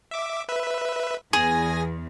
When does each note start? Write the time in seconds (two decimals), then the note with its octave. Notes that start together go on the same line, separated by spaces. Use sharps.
0.11 E5 D6
0.49 B4 E5
1.33 E2 G#4 G#5 A#6